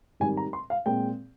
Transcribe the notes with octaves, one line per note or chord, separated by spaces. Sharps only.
G#2 D#3 G3 C4 G#5
A#5
C6
F5
A#2 G#3 C4 G5